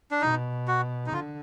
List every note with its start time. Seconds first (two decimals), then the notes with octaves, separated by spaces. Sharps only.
0.11 D4
0.21 B2 D#4
0.68 F#4
1.07 D#4
1.13 D3 F4